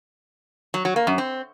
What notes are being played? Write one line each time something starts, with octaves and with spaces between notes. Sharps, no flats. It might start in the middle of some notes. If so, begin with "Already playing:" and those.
F#3
F#3
A#3
F#2
C4